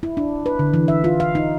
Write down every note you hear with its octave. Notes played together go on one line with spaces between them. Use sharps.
E4
D4
B4
D3
E3
E5
F4
F5
D#4